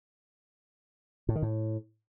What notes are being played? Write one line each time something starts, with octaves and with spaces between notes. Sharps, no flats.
A2
D#3
A2